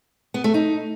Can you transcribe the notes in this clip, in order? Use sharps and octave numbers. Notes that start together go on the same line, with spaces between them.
B3
A3
D#4